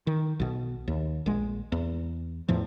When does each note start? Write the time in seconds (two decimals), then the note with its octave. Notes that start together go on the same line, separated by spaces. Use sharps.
0.07 D#3
0.40 B1 B2
0.88 D#2
1.26 A#1 G#3
1.72 E2
2.48 E2 A2 F3